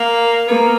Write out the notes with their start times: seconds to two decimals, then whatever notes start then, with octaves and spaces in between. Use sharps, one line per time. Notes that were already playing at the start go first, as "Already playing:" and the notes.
Already playing: A#3
0.48 A#3 B3